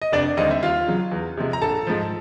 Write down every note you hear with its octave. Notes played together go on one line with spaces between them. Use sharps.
D#5
F1 D4 D5
D#2 D3 G3 C4 D#4 D#5
E5
D#2 F4 F5
C#3 F#3
E2
C3 F3 G#3
A#5
A#1 A4 A5
G#2 F3